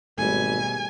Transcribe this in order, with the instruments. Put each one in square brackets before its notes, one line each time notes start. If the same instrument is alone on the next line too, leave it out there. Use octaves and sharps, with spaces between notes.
[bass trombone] G#1 [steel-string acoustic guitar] B2 G3 A3 [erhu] G#5